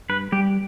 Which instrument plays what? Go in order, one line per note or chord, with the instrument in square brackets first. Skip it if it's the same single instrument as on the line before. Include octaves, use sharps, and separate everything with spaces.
[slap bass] G2 [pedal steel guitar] B4
[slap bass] G3 [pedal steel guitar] G4